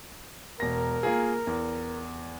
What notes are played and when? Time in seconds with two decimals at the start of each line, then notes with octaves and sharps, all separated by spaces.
0.60 E1 A#4 A#6
1.03 A#3 F4 G#4
1.47 E2